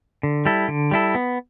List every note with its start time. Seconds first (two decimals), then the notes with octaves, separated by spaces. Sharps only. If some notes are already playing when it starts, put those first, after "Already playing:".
0.23 D3
0.45 G3 E4 A4
0.68 D3
0.91 G3 E4 A4
1.15 B3